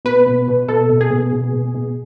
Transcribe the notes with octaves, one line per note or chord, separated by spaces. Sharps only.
B2 B4
B2
B2
B2 A4
B2
G#4
B2
B2
B2
B2